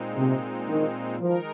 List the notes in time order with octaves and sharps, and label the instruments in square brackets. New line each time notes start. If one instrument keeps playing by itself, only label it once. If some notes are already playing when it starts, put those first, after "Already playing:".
Already playing: [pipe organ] A#2 G#3 C4 D#4
[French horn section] C3
D#3
[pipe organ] D#3 G#3 D#4 A#4 [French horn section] F3